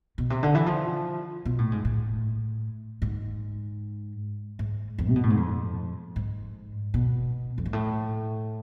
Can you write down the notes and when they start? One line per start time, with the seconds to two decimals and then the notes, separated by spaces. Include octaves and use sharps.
0.18 B2
0.30 C3
0.43 D3
0.55 E3
0.66 F3
1.45 B2
1.58 A2
1.72 G#2
1.85 A2
3.02 G#2
4.59 G#2
4.98 E2
5.09 C3
5.16 B2
5.23 A2
5.30 G#2
5.37 F2
6.16 G#2
6.94 B2
7.58 F2
7.66 G#2
7.73 A2